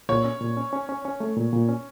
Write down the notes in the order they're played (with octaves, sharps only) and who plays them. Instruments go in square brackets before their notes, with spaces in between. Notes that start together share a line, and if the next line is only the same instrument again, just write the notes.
[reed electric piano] A#2 [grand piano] C#5
[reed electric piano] C#4
A#2
C#4
C#4
C#4
C#4
A3
A#2
A#2
C#4